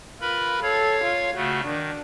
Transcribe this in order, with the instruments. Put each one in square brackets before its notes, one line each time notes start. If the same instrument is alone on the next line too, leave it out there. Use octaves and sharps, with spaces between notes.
[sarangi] F4 [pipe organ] A#4 B4 B5
[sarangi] A4 [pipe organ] C#5 F5 G#6
[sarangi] F4
[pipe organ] C#3 A3 [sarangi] F#4
[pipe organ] D#3 [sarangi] D4